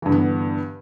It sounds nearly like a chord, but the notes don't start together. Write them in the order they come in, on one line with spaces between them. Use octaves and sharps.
E3 G2 D3 B3